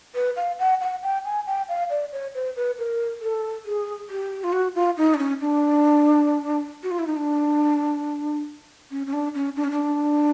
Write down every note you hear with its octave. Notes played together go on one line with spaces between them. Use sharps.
B4
F5
F#5
F#5
G5
G#5
G5
F5
D5
C#5
C5
B4
A#4
A4
G#4
G4
F4
F#4
F4
D#4
D4
C#4
D4
F#4
F4
E4
D#4
D4
C#4
C#4
D4
C#4
D4
C#4
D4